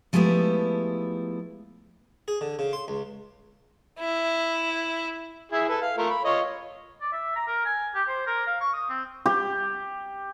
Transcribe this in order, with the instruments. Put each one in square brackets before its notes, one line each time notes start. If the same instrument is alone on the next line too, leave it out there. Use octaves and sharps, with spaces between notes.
[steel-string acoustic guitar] F3 G#3 A3 B3 E4 G4
[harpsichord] G#4
D3
C#3
C6
C#2
[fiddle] E4
[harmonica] E4 G#4 E5
A4 B4
F5
A3 F4 A#4
B5
F4 C#5 D#5
[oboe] D5
E5
A#5
A#4
G#5
G4
C5
A#4
F5
C#6
D#6
C4
[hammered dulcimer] G4